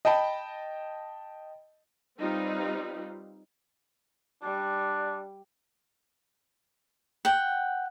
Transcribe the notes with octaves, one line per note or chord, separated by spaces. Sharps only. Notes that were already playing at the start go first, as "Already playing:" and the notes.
D#5 G5 A5 B5
G3 C4 D#4 F4 B4
G3 D4
F#5 G5